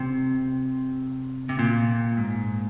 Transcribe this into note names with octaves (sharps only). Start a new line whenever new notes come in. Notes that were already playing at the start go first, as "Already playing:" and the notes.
Already playing: C3
C3
A#2
G#2